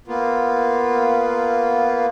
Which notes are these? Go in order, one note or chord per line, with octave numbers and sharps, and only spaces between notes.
A#3 B3 F4